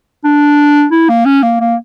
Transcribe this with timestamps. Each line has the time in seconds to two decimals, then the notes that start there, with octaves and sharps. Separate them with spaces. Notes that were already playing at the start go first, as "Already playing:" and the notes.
0.24 D4
0.91 E4
1.09 A#3
1.25 C#4
1.43 A#3
1.60 A#3